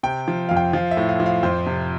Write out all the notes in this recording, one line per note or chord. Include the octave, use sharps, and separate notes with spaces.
C3 G5
F3
F2 F5
G5
F3 F5
E5
A2
F5
F3
F5
F2 C5
C3